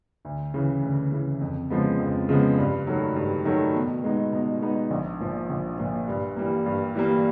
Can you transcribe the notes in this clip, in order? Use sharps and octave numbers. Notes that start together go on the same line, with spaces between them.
D2
C#3 E3
D2
C#3 E3
F2
C#3 F3 G#3 B3
F2
C#3 F3 G#3 B3
G2
D#3 F#3 A3
G2
D#3 F#3 A3
B2
G#3 B3 D#4
B2
G#3 B3 D#4
A#1
A#2 F3
A#1
A#2 F3
G2
E3 G3 A#3
G2
E3 G3 A#3